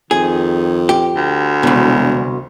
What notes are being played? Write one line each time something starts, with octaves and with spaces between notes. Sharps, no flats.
F2 D#3 G#4
G4
D2
E1 C2 B2